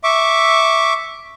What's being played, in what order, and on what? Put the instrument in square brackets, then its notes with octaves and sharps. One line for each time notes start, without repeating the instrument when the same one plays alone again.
[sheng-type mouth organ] E5 C#6 D6